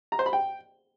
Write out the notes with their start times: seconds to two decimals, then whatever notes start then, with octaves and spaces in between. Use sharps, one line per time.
0.12 A#5
0.19 C5
0.26 B5
0.33 G5